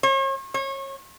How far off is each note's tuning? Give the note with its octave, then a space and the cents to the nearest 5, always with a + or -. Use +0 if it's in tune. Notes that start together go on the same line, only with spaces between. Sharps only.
C#5 -40
C#5 -30